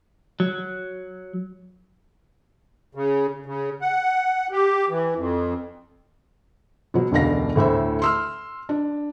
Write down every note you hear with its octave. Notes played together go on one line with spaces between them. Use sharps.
F#3
C#3
C#3
F#5
G4
E3
F2
B2 F#3
E1 C#2 D3 D4 F5 A#6
D2 A2 C5 E5
C6 E6 F6
D4